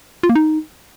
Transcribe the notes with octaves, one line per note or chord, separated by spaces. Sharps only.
F4
A#3
D#4